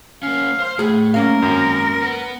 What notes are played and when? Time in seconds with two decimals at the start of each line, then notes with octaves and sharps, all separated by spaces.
0.23 A#3 C#4 F5
0.60 C5 C6
0.79 A2 A3 G#4
1.14 A#3 C#4 A#4 F5
1.42 F#2 G#3 C4
2.02 B3